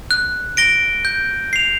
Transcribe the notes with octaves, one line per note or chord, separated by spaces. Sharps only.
F#6
A#6 D7 G7
G6
C7 F7